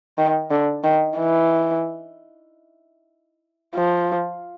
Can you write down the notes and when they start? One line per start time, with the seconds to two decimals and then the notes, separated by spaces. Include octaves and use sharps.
0.18 D#3
0.51 D3
0.84 D#3
1.16 E3
3.75 F3